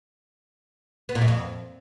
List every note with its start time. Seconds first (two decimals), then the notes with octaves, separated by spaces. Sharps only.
1.09 B3
1.15 A#2
1.22 F#2
1.28 F2